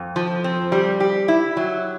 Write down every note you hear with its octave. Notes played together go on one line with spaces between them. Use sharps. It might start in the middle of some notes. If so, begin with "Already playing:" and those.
Already playing: F2
F3
C4
G3
G4
E4
F#3